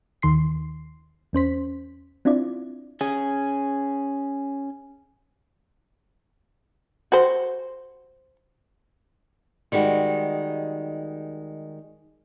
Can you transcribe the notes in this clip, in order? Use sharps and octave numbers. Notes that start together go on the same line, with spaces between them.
D#2 D#3 C6 C7
E2 C#4 C5 B6
C4 D4 E4 F4 D5
C#4 G#4
F#4 C5
D#3 G3 G#3 F#4